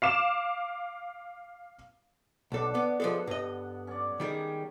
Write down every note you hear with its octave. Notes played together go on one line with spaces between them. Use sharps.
F5 D6 E7
B1 D3 D4 A4
B3
F3 G#3 B3 A4 F#5
G2 D#5
C#4 D5
D#3 G3 G#3